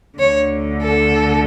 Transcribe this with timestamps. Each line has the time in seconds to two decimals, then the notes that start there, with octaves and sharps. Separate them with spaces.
0.19 D2 D3 C#5
0.82 A4